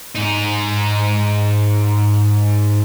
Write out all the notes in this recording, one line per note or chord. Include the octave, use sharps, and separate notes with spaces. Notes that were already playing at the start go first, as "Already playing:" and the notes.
G#2 D#4